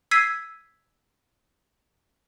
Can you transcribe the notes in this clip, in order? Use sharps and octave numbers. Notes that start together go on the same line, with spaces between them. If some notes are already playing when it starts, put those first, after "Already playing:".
E6 G#6 B6 C7 D#7